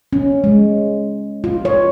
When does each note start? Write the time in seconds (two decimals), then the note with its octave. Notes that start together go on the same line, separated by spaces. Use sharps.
0.13 C#4
0.44 G#3
1.44 F4
1.65 C#5